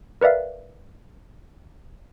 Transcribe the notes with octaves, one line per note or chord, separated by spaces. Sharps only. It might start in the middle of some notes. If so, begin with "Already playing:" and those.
A#4 B4 D5 E5 F5